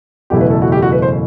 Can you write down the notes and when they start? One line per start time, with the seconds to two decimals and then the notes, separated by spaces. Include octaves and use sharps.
0.30 F#1 E2 B2 A3 E4 G4
0.41 B4
0.51 A4
0.62 F#4
0.72 G4
0.82 F#4
0.92 B4
1.02 C5